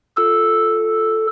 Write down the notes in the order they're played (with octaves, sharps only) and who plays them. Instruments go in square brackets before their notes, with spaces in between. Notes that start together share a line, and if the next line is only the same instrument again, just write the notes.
[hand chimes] F4 E6 [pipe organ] A4